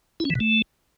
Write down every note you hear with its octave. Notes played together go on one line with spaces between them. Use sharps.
E4
C#4
E3
B2
A3